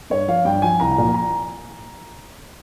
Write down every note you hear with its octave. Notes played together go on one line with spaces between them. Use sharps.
G2 C#5
F3 F5
G2 G5
F3 G#5
C2 A#5
A#2 F3
A#5